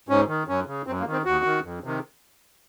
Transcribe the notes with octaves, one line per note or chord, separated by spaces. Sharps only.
G#2 C#4
D#3
F#2 C#4
C#3
F#2 C4
A#3
D#3
C4
D#2 F#4
D#3
F2
C3 D#3